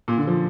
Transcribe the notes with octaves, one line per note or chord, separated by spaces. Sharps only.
A#2
D3
F3